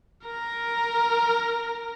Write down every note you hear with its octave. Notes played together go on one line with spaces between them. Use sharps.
A#4 A#5